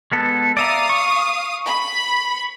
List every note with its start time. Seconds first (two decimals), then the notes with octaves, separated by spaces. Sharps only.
0.12 G#3 B3 A4
0.57 D5 E5 F5 A#5 D#6
0.89 C#6
1.65 B5